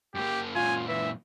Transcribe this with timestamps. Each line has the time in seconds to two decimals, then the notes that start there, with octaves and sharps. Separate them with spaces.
0.15 F#2 A#3 G4
0.56 F#2 A#2 F4 G#5
0.88 E3 E5